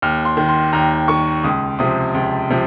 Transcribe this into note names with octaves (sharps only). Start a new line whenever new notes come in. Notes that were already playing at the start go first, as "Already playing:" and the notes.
D#2 F6
C6
D#3
C6
D#2 A#5
D#3 C#6
C#2 D#6
C3 F3 D#6
C#2
C3 F3